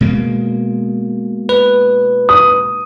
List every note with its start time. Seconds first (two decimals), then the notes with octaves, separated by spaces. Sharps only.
0.01 B2 G#3 A#3
1.49 B4
2.29 D#6